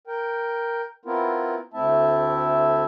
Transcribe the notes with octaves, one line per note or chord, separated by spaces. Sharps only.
A#4 G5
B3 C4 E4 F4 A#4
D2 A3 C4 E4 E5 A5